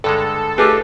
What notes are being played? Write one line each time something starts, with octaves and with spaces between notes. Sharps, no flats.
G2 D3 G#3 A4
A3 D4 D#4 F4 G4 G#4 B4